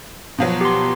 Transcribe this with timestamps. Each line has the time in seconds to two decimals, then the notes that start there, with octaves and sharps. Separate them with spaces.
0.38 B2 F3 F#3
0.61 G4 C6